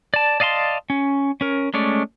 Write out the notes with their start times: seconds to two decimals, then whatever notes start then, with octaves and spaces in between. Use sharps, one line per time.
0.14 D5 A5
0.40 D5 D#5 F5 A5 C6
0.90 C#4
1.41 C#4 A#4
1.74 G#3 A3 C#4 D5